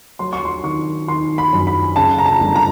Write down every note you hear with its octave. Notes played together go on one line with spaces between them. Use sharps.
F#3 C6
C#6
C6
D#3 C#6
D#3 C6
B5
F#2
B5
C#3 A5
A#5
A5
G1
A#5